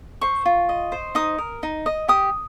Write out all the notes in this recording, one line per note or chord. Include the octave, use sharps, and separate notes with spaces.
C5 C#6
F4
D#5
C5
D#4 D#6
A#4
D#4
D#5
G4 D#6